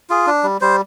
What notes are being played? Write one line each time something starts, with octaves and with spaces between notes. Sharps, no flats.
F4 G#4
D4
G3
G3 C5